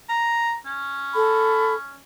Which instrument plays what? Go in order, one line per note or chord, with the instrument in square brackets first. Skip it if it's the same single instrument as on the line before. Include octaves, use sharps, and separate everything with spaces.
[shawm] A#5
C#4
[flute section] A4 B5